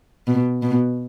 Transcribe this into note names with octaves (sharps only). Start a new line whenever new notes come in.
B2
B2